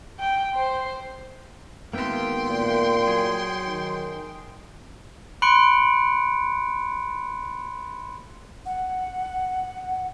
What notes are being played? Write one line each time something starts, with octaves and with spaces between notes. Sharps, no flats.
G5
C5
G#1 A#3 B3 E5 G5 C6
A#2
F#3 G#4
D#3
B5 C6 F#6 C#7 D7
F#5